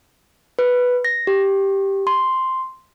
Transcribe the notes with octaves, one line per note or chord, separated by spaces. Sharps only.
B4
A#6
G4
C6